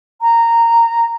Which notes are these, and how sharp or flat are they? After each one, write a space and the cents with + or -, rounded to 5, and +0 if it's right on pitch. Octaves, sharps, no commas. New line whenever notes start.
A#5 -15